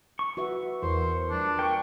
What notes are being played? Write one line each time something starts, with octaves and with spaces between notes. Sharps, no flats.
C#6
F#4 B4 E5
E2 A#4 C5
F3 G#3 D4
A#4 G5 C#6